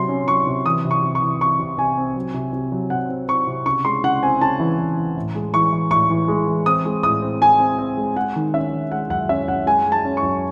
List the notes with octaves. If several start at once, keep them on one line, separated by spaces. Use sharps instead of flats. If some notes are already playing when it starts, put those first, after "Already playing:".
Already playing: C3 F#3 C6
C#4
F#3 C#6
C3
E3 D#6
C3
C#6
C3
C#6
E3
C3 C#6
C3
C3 G#5
C4
F#3
C3
C3
F#3
C3 F#5
C4
C4 C#6
C3
C#3 C#6
G#3 C6
C#3 F#5
C4 G#5
C#3 A5
E3
E3
E3
A2
G#3
E3 C#6
E3
A2 C#6
E3
G#3
E3
C4 D#6
G#3
A2 D#6
C4
G#3 G#5
C4
C4
G#3
G#3 F#5
D#3
C#4 E5
D#3
G#3 F#5
F#2 F#5
C#4 E5
F#2 F#5
G#3 G#5
G#3
A5
C#4
C#6
F#2